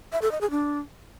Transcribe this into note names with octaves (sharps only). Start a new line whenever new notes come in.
E5
A4
D#5
G#4
D4